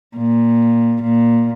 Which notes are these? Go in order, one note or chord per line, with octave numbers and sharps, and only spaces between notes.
A#2
A#2